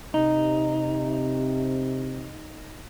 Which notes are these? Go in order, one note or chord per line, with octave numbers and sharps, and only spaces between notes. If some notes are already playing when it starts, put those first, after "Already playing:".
C3 D#4